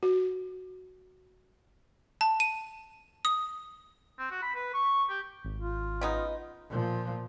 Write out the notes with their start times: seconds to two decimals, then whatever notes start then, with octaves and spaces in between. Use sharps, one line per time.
0.03 F#4
2.21 A5
2.40 D#7
3.25 D#6
4.19 C4
4.31 F#4
4.42 B5
4.55 B4
4.74 C#6
5.09 G4
5.45 G#1
5.59 F4
6.01 C#3 B3 D#4
6.69 A#2 F3